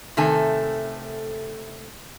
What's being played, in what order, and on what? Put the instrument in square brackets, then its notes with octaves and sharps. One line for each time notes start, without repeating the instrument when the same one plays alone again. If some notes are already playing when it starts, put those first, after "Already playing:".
[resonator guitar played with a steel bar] C3 D#3 A3 A4 G#5